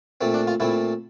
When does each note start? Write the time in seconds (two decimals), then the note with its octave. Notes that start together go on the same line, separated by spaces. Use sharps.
0.21 A#2 A3 C4
0.34 D4
0.47 F4
0.60 A#2 A3 C4 E4